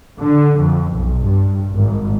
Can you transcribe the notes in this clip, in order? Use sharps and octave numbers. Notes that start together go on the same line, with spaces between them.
D3
F2
B1
G2
G#1